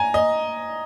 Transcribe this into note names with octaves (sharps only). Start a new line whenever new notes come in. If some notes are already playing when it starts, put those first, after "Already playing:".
Already playing: G#5 A#5
D#5